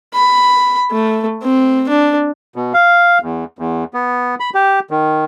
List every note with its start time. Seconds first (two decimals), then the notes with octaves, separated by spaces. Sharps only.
0.14 B5
0.91 A3
1.43 C4
1.89 D4
2.56 B2
2.74 F5
3.22 E2
3.59 E2
3.94 B3
4.40 B5
4.54 G4
4.91 D#3